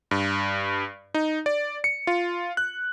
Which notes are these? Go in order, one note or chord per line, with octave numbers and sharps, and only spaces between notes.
G2
D#4
D5
C#7
F4
F#6